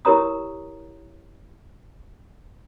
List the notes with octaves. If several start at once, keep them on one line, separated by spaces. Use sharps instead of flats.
E4 G4 A#4 C#5 A#5 D#6